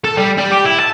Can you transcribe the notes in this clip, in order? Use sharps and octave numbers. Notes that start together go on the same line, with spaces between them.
A4
G3
G3
G4
E4
A5